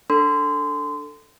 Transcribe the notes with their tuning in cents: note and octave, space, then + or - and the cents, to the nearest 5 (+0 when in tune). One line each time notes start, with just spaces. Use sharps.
D4 +0 A4 +15 C6 -25